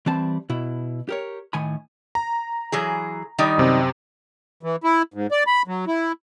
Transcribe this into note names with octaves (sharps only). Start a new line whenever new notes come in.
E3 G3 C4 A5
B2 E4
G4 A#4 C#5
A2 D#3 G#5 B5
A#5
E3 F#3 G#4
D#3 G3 D#4
F#2 C3 C4
E3
E4
G#2
D5
B5
F#3
E4